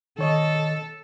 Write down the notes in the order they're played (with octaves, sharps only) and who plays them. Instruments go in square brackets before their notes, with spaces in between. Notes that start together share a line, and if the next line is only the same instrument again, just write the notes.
[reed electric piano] D#3 C#5 D#5 [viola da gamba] A4